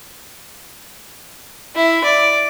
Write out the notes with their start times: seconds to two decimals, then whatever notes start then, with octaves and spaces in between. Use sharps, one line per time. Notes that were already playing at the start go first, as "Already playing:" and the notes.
1.76 E4
2.04 D5